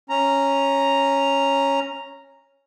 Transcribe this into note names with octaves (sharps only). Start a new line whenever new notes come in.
C#4 A#5